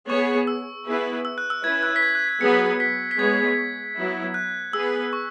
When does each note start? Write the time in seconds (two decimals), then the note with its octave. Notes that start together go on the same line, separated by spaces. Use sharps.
0.09 B3 G#4 C#5 C#6
0.47 E6
0.87 B3 E4 G#4 B4
1.25 E6
1.38 F#6
1.50 E6
1.64 C#4 E4 B4 G#6
1.83 F#6
1.96 B6
2.03 G#6
2.15 F#6
2.28 B6
2.41 F#3 B3 G#4 B4 C#7
2.80 B6
3.11 B6
3.19 G#3 B3 G#4 C#5 G#6
3.96 F#3 B3 E4
4.34 F#6
4.73 B3 G#4 B4 E6
5.13 C#6